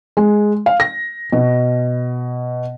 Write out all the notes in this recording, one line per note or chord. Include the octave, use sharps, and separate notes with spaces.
G#3
F5
A#6
B2